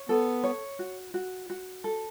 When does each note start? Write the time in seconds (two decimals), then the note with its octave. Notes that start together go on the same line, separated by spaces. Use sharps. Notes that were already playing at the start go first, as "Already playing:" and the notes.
Already playing: C#5
0.09 B3 A4
0.44 C#5
0.79 F#4
1.14 F#4
1.50 F#4
1.84 A4